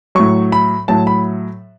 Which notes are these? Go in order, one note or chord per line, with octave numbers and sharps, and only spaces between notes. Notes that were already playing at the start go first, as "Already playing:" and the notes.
A2 F#3 C#6
B5
A2 F#3 A5
B5